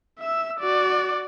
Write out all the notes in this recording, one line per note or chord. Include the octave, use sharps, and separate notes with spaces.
E5 E6
F#4 D5